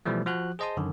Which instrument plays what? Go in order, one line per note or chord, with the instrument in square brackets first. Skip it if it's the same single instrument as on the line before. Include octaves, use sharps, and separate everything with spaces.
[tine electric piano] B2 E3 F3 G3 A3
F3 F#4 F#6
G#4 C5 D#5 A5 C6 D#6
F#2 D3 D#3